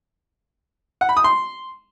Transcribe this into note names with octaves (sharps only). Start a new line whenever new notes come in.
F#5
B5
D#6
C6